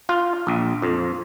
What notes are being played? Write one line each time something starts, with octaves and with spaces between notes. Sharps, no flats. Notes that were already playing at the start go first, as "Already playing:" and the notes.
F4
A#1
F2